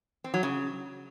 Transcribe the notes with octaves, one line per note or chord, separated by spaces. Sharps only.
C4
F#3
C#3